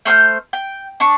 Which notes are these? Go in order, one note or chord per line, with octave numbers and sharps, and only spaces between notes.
A3 C5 F6 G6
G5
D4 C#6